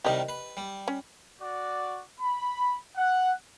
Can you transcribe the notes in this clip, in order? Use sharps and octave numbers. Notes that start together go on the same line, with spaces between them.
C2 D#3 G3 G4 D#5
B4
G3
C#4
F#4 D5
B5
F#5